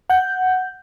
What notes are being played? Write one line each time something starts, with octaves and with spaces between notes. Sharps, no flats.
F#5 G6